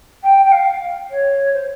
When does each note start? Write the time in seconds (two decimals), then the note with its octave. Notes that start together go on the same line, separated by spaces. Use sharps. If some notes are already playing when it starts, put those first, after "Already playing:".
0.23 G5
0.45 G5
0.52 F5
1.10 C#5
1.54 C5